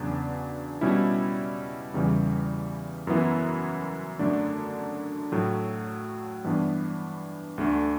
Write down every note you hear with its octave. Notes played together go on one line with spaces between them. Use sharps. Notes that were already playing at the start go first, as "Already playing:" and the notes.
Already playing: E2 C#3 F#3 B3 D4
B2 G3 C#4 E4
E2 C#3 E3 G3
F#2 E3 B3 E4
F#2 D3 A3 D4
A2 F#3 A3
G2 E3 B3 D4
D2 D3 A3 D4